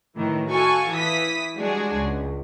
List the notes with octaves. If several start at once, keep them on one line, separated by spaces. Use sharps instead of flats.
A2 D#3 E3
F#4 A4 F5 G#5 C#6
E3 D#6 B6
G3 G#3 D4 F#4 G#4
C#2